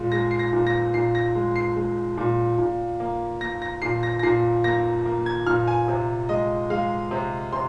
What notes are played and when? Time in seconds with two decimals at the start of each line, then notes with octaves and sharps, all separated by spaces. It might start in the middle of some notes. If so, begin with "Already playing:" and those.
Already playing: A#2 G#3
0.12 G#3 A#6
0.31 C7
0.39 A#6
0.53 A#2
0.67 A#6
0.94 A#2 C7
1.15 A#6
1.35 G#3
1.56 C7
1.76 G#3
2.18 A#2
2.58 A#2
3.00 A#3
3.41 A#3 A#6
3.62 A#6
3.82 A#2 C7
4.03 A#6
4.19 A#6
4.23 A#2 C7
4.64 A#3 A#6
5.05 A#3
5.26 G#6
5.46 A#2 F6
5.67 G#5
5.88 C3
6.29 G#3 D#5
6.70 G#3 F5
7.11 C3
7.52 C3 C6